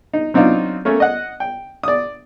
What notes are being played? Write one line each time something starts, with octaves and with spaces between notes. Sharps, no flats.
D#4
F#3 C4 D4 D#4 F4
A3 A#3 C#4 A#4
D#5 F#5
G5
D5 D#6